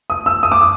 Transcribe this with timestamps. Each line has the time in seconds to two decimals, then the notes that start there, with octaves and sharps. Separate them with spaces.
0.10 D#6
0.26 E6
0.43 D#6
0.52 D6
0.61 D#6